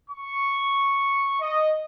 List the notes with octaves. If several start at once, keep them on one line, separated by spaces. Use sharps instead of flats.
C#6
D#5